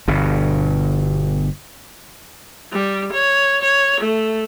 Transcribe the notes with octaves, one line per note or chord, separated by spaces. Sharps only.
G1 G2 B2
G3
C#5
C#5
A3